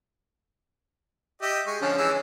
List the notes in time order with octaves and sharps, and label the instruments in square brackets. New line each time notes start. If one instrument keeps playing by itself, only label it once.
[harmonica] G4 D#5 E5
G#3 C#6
[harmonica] D3 F3 [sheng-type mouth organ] C#4
[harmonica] E3 G#3 E6